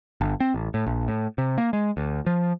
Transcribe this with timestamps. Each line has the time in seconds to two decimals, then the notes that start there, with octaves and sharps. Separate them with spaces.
0.21 G1
0.40 C4
0.54 A1
0.74 A2
0.86 A#1
1.08 A2
1.38 C3
1.58 A#3
1.73 G#3
1.97 D2
2.26 F3